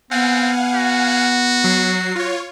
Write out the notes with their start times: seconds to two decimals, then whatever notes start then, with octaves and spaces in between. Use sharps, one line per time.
0.11 B3 C4 F5 F#5 G#5
0.75 F#4
1.64 F#3 C7
2.15 F4 C#5